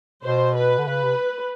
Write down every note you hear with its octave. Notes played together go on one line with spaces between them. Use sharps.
B2 C5
B4
D3
C#3 B4
C3